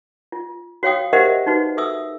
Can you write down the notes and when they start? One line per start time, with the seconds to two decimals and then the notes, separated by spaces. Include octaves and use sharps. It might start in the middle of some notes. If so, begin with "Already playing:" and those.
0.32 F4
0.83 F#4 C#5 F5 G5 D#6
1.13 G4 A#4 C5 D#5 E5 F#5
1.46 D#4 F#4 B4
1.77 A4 E5 D#6 E6